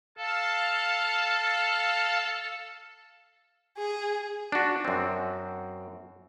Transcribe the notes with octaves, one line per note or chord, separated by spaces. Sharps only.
A4 F5 A5
G#4
D4 F#4
F#2 C4